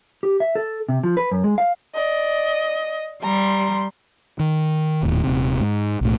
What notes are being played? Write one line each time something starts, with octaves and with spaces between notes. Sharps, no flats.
G4
E5
A4
C3
F3
B4
F#2
G#3
F5
D5 D#5
G3 A#5 C6
D#3
D#1 D#2 A2
D#1 C3
G#2
B1 A2